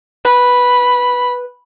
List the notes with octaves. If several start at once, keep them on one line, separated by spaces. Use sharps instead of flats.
B4 B5